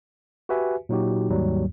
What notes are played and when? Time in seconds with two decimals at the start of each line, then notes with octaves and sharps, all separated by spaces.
0.49 F#4 G4 B4 E5 G#5
0.89 A#2 F#3 D#4 F#4 G4
1.30 D#2 G#2 F#3 G3